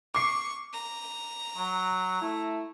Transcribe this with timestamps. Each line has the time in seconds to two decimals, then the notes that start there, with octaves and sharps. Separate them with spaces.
0.15 C#6 D6 C7
0.73 A#5
1.57 F#3
2.22 A3 E4